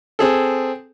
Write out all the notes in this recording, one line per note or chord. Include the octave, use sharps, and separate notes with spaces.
C4 G#4 A4